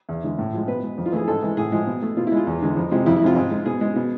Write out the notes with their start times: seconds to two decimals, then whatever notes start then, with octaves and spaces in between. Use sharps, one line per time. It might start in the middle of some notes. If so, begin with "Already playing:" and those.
0.09 E2
0.23 D3 G#3
0.39 A2
0.53 F3 G#3
0.68 B2 B4
0.83 G#3
0.98 F2
1.06 F4
1.12 E3 A3 G#4
1.28 G#2 A4
1.43 E3 G#3
1.57 A2 G#4
1.72 F3 G#3
1.87 B2
2.02 A3
2.17 B2 F4
2.27 E4
2.32 G#3 F4
2.47 E2
2.62 D3 G#3
2.77 F2
2.91 C3 F3 G#3
3.06 F2 E4
3.16 E4
3.22 C3 G#3 F4
3.36 G#2
3.51 G#3
3.66 B2 G#4
3.81 G#3
3.96 B2